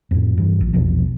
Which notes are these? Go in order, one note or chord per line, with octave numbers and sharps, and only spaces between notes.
F2 A2
G2 E3
A#1
A#1 E2 B2 F3